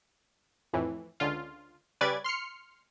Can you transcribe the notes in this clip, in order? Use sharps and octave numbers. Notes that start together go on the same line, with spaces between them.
F2 A2 E3
C#2 D3 F4
C#3 G3 B4 D5 G#6 A6
C6 F6 C7 C#7